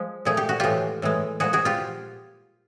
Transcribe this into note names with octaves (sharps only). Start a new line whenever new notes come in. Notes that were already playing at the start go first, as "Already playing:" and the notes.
Already playing: F3 G#3
A#2 F3 A3 G#4
G4
F#4
A2 E3 G#3 F4 G4
A2 E3 G#3
A#2 F3 G#3 F#4 G#4
F#4 G#4
F4 G4